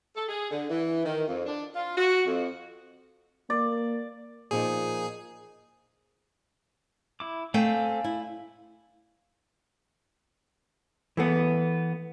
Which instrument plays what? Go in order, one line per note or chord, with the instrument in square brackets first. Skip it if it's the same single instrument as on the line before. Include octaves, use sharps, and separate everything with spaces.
[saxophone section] A4
G#4
D3
E3
D#3
F2
D4
F4
F#4
F2
[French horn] A#3 [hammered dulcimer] D5
[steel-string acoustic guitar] A#2 F3 D#4 [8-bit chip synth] G#4
[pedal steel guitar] E4 D6
[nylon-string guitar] A3 C4 G5 [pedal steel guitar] D5 F5 G#5
[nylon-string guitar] E4
[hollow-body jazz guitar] E3 A3 B3